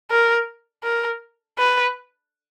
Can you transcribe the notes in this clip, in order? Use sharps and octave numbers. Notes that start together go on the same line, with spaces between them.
A#4
A#4
B4